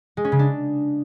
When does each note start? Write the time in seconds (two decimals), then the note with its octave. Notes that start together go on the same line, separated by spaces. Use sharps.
0.17 G#3
0.25 C#4
0.32 C#3
0.39 D4